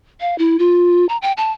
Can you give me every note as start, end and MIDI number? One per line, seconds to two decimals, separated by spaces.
0.21 0.38 77
0.39 0.57 64
0.59 1.06 65
1.09 1.17 82
1.22 1.32 79
1.37 1.51 81